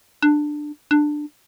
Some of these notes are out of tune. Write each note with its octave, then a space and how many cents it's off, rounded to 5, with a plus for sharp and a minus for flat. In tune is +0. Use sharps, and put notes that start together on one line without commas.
D4 +15
D4 +15